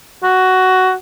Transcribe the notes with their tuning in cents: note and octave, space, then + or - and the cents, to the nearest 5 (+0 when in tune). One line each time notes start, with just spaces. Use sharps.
F#4 +10